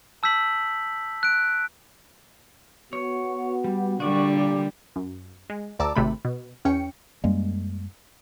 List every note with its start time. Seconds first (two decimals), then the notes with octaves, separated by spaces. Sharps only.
0.23 A5 E6 G6 B6 F#7
1.23 F#6 D7
2.93 B3 F#4 C#5
3.64 G3
4.00 A#2 D3 G3 F#4 D5 C#6
4.38 G4
4.96 F#2
5.50 G#3
5.79 D2 D5 A5 A#5 D6 E6
5.96 G#1 C3 A3 B5
6.25 B2
6.65 E2 C#4 G5 C#7
7.24 F#2 G3 G#3 A#3